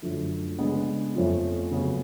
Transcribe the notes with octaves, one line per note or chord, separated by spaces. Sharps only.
F#2 D3 F3 A3
C#3 G#3 B3 D4
F2 F3 A3 C#4 F4
C#3 F#3 B3